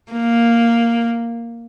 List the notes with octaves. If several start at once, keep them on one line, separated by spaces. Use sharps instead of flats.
A#3